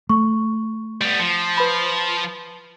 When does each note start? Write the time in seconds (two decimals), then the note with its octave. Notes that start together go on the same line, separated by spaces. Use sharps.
0.09 A3 C#6
1.02 G3 B3
1.20 F3 C#7
1.57 B4 B5